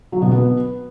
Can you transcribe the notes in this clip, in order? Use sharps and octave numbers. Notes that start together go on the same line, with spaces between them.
F#3
B2
B3